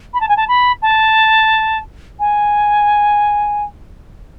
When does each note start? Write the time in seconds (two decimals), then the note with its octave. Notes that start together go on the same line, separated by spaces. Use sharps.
0.14 B5
0.21 A5
0.28 G#5
0.37 A5
0.48 B5
0.82 A5
2.19 G#5